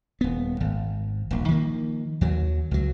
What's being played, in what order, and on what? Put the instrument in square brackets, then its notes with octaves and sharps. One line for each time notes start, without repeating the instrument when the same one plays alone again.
[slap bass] D#1 B3
G#1
D#1 A#1
D#3 F3 A#3
D#2 F#3
C#2 F#3